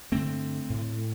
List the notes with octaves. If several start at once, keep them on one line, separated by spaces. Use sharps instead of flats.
G2 D3 A3 C4
A2